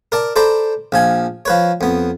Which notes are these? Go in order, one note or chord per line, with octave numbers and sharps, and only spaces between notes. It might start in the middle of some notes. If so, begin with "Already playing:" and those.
A#4 D5 A5
A4 C5 D5 A#5 B5
A#1 F3 G#5
F3 B4 C#5
F2 B3